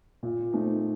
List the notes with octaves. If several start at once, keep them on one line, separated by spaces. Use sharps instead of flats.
A#2
A3 C4 D#4